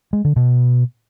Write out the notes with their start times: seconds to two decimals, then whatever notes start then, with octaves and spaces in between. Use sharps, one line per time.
0.13 G#3
0.25 D3
0.36 B2